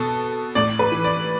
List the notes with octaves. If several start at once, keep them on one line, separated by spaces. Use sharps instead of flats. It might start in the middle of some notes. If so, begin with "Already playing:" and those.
Already playing: B2 A4
A2 D5
B4
E3
D5